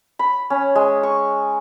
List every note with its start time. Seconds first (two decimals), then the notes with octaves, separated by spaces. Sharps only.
0.19 B5
0.50 C#4
0.75 G#3
1.03 C#6